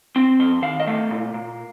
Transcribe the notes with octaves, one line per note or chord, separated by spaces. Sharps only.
C4 C6
F2 C6
D#3 F5
D#5
A3 F5
A#2
A#2